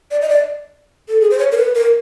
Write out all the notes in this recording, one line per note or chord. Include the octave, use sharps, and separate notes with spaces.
D5
D#5
D5
A4
G#4
C5
C#5
A#4
B4
A#4